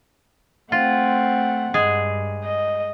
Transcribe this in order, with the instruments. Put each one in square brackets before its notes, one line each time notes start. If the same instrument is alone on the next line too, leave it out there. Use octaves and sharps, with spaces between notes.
[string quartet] A3 C4 [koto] F4 [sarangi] F#5
[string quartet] G2 [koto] G#3 G#4
[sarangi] D#5